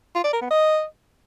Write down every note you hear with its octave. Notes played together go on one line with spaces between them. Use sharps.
F4
D5
A#4
B3
D#5